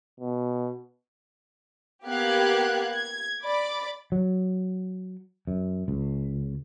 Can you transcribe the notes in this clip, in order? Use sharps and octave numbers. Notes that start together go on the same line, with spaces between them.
B2
A#3 B3 G4 F5 F#6 G#6
G#6
D5 B5 D6
F#3
F#2
C#2